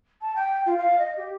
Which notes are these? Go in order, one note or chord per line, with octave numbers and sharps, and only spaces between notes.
A5
G5
F4
F5
D#5
G4